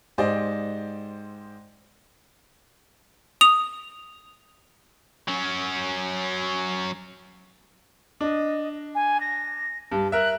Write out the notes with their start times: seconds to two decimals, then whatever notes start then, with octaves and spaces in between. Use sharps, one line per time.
0.18 G#2 G4 C5 D5 D#5
3.41 D#6 F7
5.28 F#3 C#4
8.21 D4 D#5
8.95 G#5
9.21 A#6
9.92 G2 A5
10.12 A#4 E5 F#6